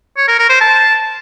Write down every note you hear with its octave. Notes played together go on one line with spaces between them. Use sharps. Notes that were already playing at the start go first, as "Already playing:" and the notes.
C#5
A#4
A#4
C5
A5